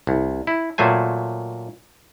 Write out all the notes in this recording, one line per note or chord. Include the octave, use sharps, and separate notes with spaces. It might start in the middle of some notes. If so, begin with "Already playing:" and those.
C2
E4
A#2 F#3 A3 C5 G#5